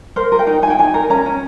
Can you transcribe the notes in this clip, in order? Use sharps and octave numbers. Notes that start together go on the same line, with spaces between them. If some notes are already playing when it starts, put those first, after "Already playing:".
A#4 C5
A#4
G5
D#4
D#4 G#5
G5
D#4 G#5
A#4
C#4 A#5
C#4